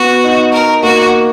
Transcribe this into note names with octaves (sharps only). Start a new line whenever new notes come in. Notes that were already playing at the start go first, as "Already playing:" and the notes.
Already playing: B3 F#4
D#4
A#4
A#3 F#4